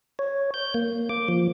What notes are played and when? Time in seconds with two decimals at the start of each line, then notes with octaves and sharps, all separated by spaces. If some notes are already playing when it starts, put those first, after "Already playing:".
0.19 C#5
0.54 G6
0.74 A#3
1.09 D6
1.28 F3